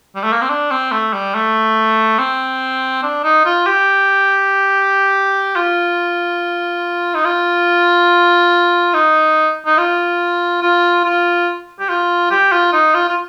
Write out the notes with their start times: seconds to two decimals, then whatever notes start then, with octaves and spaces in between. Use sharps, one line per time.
0.16 G3
0.24 A3
0.33 A#3
0.41 C4
0.50 D4
0.71 C4
0.92 A3
1.13 G3
1.35 A3
2.18 C4
3.03 D4
3.24 D#4
3.46 F4
3.67 G4
5.56 F4
7.15 D#4
7.25 F4
8.94 D#4
9.67 D#4
9.78 F4
10.62 F4
11.04 F4
11.80 G4
11.89 F4
12.31 G4
12.52 F4
12.73 D#4
12.95 F4
13.08 F4